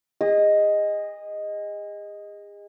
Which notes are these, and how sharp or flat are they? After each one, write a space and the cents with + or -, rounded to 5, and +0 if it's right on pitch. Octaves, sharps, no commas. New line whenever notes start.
G#4 -35 D#5 +0